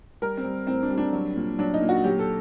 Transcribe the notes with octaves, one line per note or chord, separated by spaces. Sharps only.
G3 A#4
C4
G3
A2 C4
D4
G3
D4
F#3
A#2
F#3 D4
D#4
A#2
F#4
F#3 G4
A4